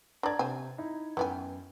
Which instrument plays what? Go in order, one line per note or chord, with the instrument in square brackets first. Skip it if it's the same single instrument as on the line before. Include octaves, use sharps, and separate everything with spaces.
[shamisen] D4 D5 [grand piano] A#5 G#6
[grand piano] C3 [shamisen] C5 G#5
[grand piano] D#4 E4
[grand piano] F#2 G5 [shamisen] E3 B3 G#5